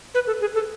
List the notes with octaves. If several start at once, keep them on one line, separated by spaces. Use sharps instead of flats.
B4
A4
G#4
A4